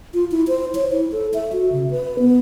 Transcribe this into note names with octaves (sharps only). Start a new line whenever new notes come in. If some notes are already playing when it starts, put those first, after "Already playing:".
F4
E4
C5
C#5
E4
A4
E5
F#4
C#3
B4
B3